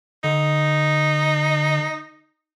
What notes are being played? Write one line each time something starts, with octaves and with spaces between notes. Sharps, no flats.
D3 D#4